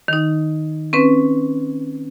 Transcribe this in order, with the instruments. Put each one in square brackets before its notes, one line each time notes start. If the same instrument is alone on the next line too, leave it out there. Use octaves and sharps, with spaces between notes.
[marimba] D#3 D#4
C4 C#4 B4